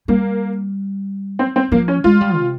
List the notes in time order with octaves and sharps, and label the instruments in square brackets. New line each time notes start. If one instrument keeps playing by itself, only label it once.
[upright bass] G3 [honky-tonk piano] A#3
[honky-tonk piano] C4
C4
[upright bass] F3 [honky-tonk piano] A#3
[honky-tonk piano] C#4
[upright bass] G#3 [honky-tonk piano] F4
[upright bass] G3
C3